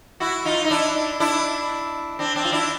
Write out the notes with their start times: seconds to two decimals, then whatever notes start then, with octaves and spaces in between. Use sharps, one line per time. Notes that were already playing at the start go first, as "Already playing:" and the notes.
0.20 E4 F#4
0.45 D#4 F4
0.65 D#4
0.71 D4 E4
1.20 D4 E4
2.19 C4 D4
2.36 C4 D4
2.45 F4
2.52 D4 E4